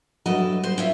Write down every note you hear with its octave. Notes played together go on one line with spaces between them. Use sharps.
G2 F#3 A4 D#5
C5
C#4 F4 E5